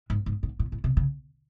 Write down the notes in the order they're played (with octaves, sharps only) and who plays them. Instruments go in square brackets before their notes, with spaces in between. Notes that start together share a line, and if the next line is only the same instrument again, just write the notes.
[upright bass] G#2
G#2
G#2
A2
A2
C3
C#3